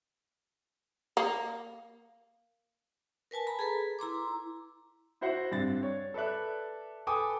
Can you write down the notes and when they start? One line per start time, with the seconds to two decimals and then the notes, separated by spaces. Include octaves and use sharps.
1.17 A#3
3.31 A#4 B4 G#5 A5
3.47 A#5 B5
3.59 G#4 A4 B4
3.99 E4 A#5 C6 D6
5.21 E4 F#4 C5 E5 F#5
5.52 G2 C4 D4 A6
5.83 C#5
6.14 A4 B4 D5 E5 F#6
7.07 A4 B4 G5 G#5 D6 D#6